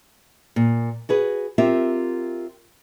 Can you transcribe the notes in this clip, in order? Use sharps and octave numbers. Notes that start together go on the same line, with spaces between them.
A#2
F#4 G#4 B4
C4 F4 G4 A#4 E5